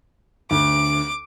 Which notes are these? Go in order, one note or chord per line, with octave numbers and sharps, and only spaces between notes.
D2 D6